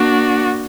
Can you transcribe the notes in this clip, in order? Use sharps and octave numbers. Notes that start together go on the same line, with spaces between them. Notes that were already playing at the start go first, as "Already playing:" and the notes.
Already playing: A#3 D4 F#4